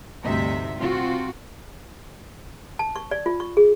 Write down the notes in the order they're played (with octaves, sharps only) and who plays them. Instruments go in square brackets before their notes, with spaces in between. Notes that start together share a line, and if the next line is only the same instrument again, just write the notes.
[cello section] D2 G2 C3 D#4 E5
C3 C4 F4 F#4
[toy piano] A5
C#6
D5
F4
C#6
G#4